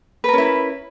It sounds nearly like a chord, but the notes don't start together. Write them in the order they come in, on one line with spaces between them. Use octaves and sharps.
B4 A#4 C#4 E4